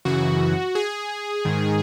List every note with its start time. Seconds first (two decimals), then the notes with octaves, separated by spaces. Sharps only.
0.05 F#2 C#3 E3 F#4
0.75 G#4
1.45 G#2 D#3